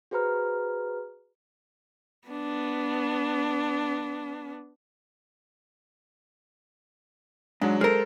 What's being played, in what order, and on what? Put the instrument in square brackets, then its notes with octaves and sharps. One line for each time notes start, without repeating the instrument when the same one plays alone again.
[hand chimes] F#4 G#4 B4 C5 A#5 F6
[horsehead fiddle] B3 D4
[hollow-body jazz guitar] G#2 [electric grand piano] F#3 G#3 D4
[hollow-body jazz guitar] G#3 A#4 [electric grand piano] A4 C5 F6